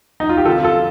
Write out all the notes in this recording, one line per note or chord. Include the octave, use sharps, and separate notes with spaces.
D#4
F4
G4
F2 D3 F3 F4 A4
F4 A4